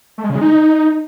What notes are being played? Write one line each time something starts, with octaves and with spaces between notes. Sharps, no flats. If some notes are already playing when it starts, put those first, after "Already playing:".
A3
G#3
C#3
G#3
D#4